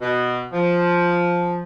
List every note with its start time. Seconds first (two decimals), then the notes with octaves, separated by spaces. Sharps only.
0.01 B2
0.53 F3